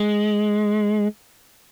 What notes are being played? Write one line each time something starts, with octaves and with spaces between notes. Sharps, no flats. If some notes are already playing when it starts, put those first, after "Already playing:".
Already playing: G#3